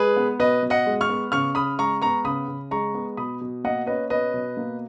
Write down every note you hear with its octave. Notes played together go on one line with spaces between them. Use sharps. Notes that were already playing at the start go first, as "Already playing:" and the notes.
Already playing: G#3 G#4 B4
B3
B2 B4 D#5
B2
D#5 F#5
G#3
C#6 F6
B3
C#3 C#6 F6
C#3 B5 D#6
G#3 A#5 C#6
B3 A#5 C#6
C#3 B5 D#6
C#3
G#3 A#5 C#6
B3
B2 B5 D#6
B2
A#3 D#5 F#5
C#4 B4 D#5
B2 B4 D#5
B2
A#3